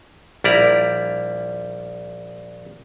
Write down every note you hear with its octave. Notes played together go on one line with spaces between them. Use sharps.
A#1 G3 E4 D5 A#5